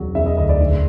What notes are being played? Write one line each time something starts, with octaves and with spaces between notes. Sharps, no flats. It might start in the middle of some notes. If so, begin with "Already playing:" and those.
Already playing: E1 F#3
E1 E5
D#5
D2 D#5
D5
A#1